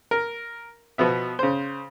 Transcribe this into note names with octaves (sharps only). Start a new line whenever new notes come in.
A#4
B2 F3 B3 E5
C#3 C5